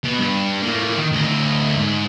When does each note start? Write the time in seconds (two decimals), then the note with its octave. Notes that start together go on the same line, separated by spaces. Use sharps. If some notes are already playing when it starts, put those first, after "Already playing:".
0.04 B2
0.19 G2
0.62 A2 A#3
0.98 D#3
1.12 D2 D#5
1.77 G#2